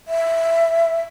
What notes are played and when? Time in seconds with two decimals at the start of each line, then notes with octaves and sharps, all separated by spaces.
0.08 E5